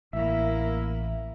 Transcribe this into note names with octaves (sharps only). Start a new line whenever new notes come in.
A1 A#3 E4 E5